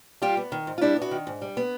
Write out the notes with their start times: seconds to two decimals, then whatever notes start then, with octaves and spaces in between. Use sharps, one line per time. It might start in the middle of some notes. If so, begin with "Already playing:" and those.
0.22 G3 F4 G4
0.37 B3
0.52 D#3
0.67 G#2
0.78 F4
0.81 G3 D4 E4
0.97 B3
1.02 E4 F#4
1.11 D#3
1.27 G#2
1.42 G3
1.57 B3